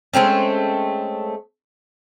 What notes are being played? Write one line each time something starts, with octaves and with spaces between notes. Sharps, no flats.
G#3 A3 C4 C#4